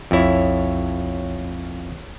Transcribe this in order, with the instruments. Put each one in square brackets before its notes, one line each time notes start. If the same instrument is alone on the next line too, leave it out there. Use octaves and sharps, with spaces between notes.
[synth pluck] B1 C#5 [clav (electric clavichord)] F2 E4